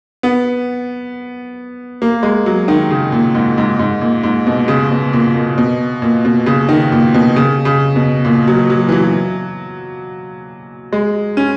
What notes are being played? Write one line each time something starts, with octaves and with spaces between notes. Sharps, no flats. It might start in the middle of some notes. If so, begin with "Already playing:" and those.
B3
A#3
G#3
F#3
D#3
C#3
A#2
G#2
G#2
G#2
A#2
G#2
B2
C#3
B2
A#2
A#2
B2
A#2
B2
C#3
D#3
A#2
B2
C#3
C#3
B2
A#2
F#3
F#3
E3
F#3
G#3
C#4